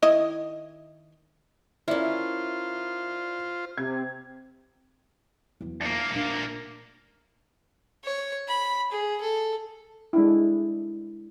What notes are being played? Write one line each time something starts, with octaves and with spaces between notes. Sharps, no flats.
D#3 E4 D#5
C#4 E4 F4 A#4 C5 D5 E5
C3 G#6
E2 F#3
D2 A#3
A#1 D4
C#5
B5
G#4
A4
G#3 D4 E4